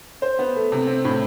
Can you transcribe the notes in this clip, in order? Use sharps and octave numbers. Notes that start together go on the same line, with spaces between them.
C5
B3
A3
C3
C4
A2